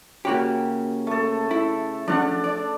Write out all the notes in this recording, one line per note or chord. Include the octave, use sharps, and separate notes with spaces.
C#3 A#3 F#4 G4
A3 A4
E4
F3 C#4 D4 F#5
D5